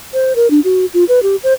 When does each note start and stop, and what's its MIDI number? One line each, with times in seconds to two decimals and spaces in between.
0.13 0.33 72
0.36 0.50 70
0.51 0.60 62
0.64 0.86 66
0.94 1.04 65
1.09 1.20 71
1.23 1.36 67
1.43 1.53 72